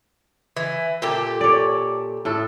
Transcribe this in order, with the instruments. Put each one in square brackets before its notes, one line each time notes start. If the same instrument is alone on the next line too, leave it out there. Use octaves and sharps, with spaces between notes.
[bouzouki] E3
A#2 G4 A4
[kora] C#5 D5
A2 A4